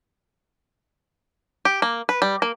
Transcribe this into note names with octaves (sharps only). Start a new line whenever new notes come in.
G4
A#3
B4
G3
A#3